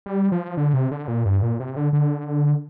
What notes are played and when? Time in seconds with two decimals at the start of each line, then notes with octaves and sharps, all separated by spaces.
0.06 G3
0.32 F3
0.57 D3
0.74 C3
0.91 D3
1.08 A#2
1.26 G2
1.42 A#2
1.60 C3
1.76 D3
1.93 D3